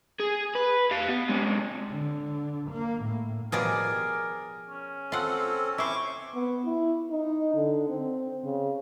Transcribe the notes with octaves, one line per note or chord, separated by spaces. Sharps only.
G#4
B4
G4 F5
B3
C3 G#3
D3
A#3
A2
B2 F3 G3 G#4 A#4 D5
C#4
C4 F4 A4 F#5
C#4 E4 C5 C#6 D6
B3
E4
D#4
D3
C4
C#3